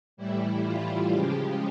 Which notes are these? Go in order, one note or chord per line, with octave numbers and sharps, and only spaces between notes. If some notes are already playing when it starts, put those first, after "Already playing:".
A2 E3 G3 E4
F4
C#3 F3 G#3 G4